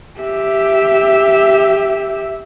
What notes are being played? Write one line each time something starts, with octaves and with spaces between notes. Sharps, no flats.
G4 E5